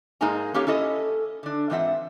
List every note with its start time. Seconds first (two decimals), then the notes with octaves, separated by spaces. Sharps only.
0.21 G#2 G#3 A#3 D#4 G#5 A#5
0.54 A#3 C#4 G4 A4 C#5 F5
0.67 C#4 E4 A4 D#5
1.43 D3 D4
1.70 G#2 E3 C4 F4 E5 F#5